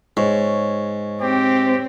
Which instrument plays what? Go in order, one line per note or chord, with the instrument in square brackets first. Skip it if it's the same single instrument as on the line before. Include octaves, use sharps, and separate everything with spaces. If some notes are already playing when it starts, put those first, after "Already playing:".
[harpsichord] G#2 [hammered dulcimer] C#5
[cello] C4 [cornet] G4